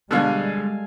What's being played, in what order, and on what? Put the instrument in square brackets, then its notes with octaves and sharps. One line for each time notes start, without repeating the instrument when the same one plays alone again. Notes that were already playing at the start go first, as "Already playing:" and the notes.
[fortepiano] B2 D3 [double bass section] G3 G#3 [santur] A4 F5 G#5